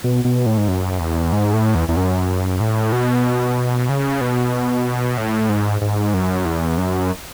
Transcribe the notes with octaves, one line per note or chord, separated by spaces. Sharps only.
B2
B2
A2
G#2
F#2
E2
G#2
A2
E2
E2
F#2
A2
B2
C#3
B2
A2
G#2
G#2
F#2
E2
F#2